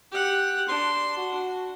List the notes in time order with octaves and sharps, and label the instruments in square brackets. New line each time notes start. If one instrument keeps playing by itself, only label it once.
[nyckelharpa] G4 F#5
[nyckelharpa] D4 [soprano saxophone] C6
[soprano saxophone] F#4